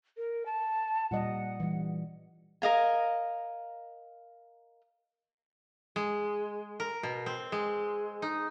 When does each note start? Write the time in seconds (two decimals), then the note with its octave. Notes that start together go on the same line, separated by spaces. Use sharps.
0.17 A#4
0.46 A5
1.11 A#2 G3 D#5 F#5
1.60 E3 G3
2.62 A#4 D#5 F5 G#5
5.96 G#3
6.80 A#4
7.03 B2
7.26 C4
7.52 G#3
8.22 D#4